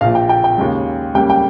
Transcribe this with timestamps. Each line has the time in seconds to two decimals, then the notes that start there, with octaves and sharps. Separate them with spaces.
0.01 A#1 A#2 F3 F5
0.15 G5
0.29 G5
0.44 G5
0.58 D#2 C#3 G#3
1.15 C#2 C#3 G3 A#3 G5
1.30 G5